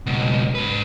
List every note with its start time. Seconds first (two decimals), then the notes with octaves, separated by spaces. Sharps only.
0.06 C#2 B2
0.55 G#2 B4